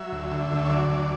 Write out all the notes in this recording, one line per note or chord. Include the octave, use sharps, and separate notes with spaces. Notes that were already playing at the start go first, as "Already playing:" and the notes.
Already playing: F#3 E5
D2
D3
D2
C#5
F#3 D5
D2